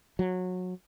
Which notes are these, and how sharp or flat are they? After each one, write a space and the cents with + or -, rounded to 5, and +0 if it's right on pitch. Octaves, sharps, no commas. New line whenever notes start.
F#3 -20